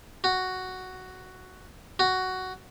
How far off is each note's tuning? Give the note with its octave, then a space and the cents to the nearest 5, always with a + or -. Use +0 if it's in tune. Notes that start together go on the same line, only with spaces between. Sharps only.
F#4 +5
F#4 +10